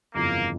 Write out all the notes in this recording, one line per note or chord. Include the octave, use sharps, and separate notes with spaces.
G1 F2 C#3 E3 A#3